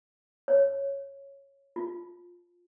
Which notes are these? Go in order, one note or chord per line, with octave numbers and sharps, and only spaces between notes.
C#5
F4